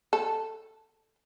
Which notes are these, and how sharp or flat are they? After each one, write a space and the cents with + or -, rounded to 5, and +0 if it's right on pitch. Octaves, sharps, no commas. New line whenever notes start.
A4 +5